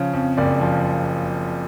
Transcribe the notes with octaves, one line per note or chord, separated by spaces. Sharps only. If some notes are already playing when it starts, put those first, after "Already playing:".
Already playing: C#3 F3 C#5
F2
F#1 D5
F3